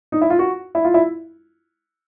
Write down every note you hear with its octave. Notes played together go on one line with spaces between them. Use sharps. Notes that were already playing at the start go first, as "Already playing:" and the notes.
D#4
E4
F4
F#4
E4
F4
E4